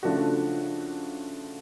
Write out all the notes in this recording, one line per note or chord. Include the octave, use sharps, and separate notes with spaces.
C#3 F3 A3 D4 F#4